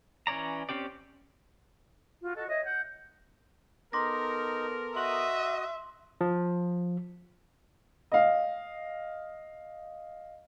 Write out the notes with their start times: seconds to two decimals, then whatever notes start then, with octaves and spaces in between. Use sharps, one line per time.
0.27 E3 C#4 C#5 D5 A#5
0.69 C4 C#4 G4 D5
2.21 F4 F#4
2.35 F#4 A4 D#5
2.48 C#5 D#5 E5
2.65 F#5 G6
3.93 B3 D#4 A4 A#4 C6 D6 A#6
4.96 F#4 D#5 E5 C6 D#6 F#7
6.21 F3
8.12 D#5 F5